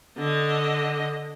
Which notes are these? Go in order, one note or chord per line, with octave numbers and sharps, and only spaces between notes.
D3 D#5